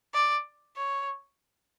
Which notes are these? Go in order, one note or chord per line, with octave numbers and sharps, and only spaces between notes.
D5
C#5